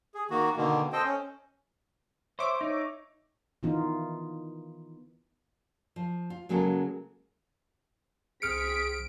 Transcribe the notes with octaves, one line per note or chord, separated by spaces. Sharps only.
G#4
D#3 A#3 F#4
B2 D3 D#3 A#3
C4 A4 C5 D#5 G5
C#4
C5 C#5 E5 D6
D#4
D#3 E3 B3 D#4 F4
F3
F4
C#3 F#3 G#3 A#3 F#4 A4
C2 C4 G#4 F6 B6 C#7 D7